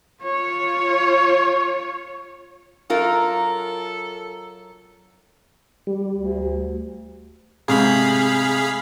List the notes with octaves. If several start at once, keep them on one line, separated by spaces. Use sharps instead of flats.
F4 C#5
F#2 F4 A4 A#4
G3
D2
G#2 C3 A3 G#4 F5 B5